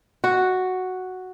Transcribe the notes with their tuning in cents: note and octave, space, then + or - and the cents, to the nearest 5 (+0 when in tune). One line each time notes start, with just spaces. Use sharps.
F#4 +0